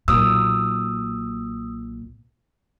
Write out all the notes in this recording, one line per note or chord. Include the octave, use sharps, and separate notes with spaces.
B1 A#2 D#6 E6